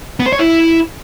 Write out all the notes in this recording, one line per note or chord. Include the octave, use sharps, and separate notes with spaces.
B3
C5
C#5
E4